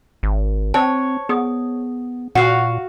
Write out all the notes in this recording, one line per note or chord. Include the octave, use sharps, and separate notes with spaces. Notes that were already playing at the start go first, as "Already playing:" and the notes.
G#1
C4 C5 C#5 A5
B3 G#4 D#6
A#2 F#4 F5 F#5